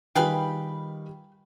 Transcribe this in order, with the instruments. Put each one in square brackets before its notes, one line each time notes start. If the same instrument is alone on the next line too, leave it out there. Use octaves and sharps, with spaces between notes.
[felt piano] D#3 G3 [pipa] F4 G#4 B4 [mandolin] G5 B5 F6